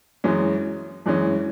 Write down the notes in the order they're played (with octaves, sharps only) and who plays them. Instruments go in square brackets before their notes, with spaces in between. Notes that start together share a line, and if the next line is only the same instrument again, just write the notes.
[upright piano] F#2 E3 G#3 C#4
F#2 E3 G#3 C#4